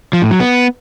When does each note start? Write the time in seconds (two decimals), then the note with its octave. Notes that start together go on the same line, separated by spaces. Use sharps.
0.13 F3
0.22 A2
0.31 F#3
0.40 B3